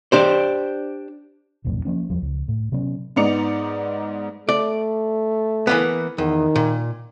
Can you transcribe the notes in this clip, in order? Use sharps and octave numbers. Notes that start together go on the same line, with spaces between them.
D4 G4 C5
D#1 B1 F2 A2
F3 A#3 C#4
E2 F3 G3
C#2
A2
C3 F#3 B3 C#4
G#2 B3 D#4 D5 C#7 F7
A3 D5
E3 A#3 B3
E2 D#3
A#2